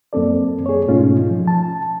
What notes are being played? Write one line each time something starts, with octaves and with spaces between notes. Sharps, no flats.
F#2 A#3 C4 A4 D5
G#4 C#5
G#2 B2 A3 C#4 D#4 F4
F3
A5